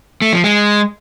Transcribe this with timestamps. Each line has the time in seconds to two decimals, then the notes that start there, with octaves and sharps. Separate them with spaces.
0.22 A3
0.33 F3
0.44 G#3